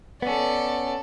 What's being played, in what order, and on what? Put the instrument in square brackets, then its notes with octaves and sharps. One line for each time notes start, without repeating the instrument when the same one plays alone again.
[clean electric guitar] B3 C#4 [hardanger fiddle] A4 D5